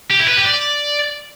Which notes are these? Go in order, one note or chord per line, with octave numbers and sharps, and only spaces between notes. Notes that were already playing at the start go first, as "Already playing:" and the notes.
G4
E4
B4
G4
D5